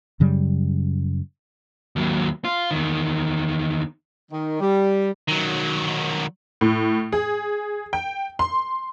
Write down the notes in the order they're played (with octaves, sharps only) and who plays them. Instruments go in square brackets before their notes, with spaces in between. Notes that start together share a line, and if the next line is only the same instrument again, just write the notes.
[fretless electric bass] F#2 C#3 F#3 G3
[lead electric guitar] D#2 F#3
F4
E2 D#3
[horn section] D#3
G3
[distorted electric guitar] D#3 F#3
[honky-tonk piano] A2
G#4
G5
C6